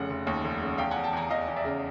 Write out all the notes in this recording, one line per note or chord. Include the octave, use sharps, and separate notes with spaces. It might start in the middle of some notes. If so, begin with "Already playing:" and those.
Already playing: F1 C#3 F#5
F1
D#2
F1
C#3
E2 F5 G5
F#5 G#5
E2
G5 A5
E2 G#5 A#5
E2 D#5 F5
E2
D5 E5
C#3